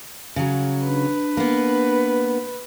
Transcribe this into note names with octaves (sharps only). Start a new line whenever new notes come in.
C#3 F#3
D4 B4
A#3 B3